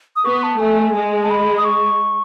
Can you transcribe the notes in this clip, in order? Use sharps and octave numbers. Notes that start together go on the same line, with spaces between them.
D#6
B3 C#6
A5
A3 G#5
G#3
A5
B5
D#6
C#6